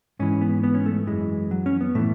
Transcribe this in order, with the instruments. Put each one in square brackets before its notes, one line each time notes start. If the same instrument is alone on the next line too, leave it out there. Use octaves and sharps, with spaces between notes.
[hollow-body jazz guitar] G#2 E3 C#4
B3
B3
C#4
A3
F#2 E3 G#3
F#3
C#4
B3
A2 E3 A3